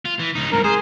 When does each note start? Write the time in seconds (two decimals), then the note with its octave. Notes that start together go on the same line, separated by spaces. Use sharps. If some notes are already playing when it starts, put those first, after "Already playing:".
0.05 F4
0.19 E3
0.35 C#2 D#4
0.52 C2 G#2 A#4
0.64 G#4 C5